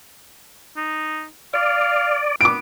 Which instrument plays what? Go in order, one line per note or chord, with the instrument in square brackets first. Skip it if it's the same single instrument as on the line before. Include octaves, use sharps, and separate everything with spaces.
[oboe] D#4
[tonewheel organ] D5 [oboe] F5
[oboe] B3 [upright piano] D6 D7